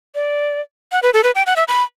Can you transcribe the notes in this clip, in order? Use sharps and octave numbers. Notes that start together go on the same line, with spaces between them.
D5
F#5
B4
A4
B4
G5
F#5
E5
B5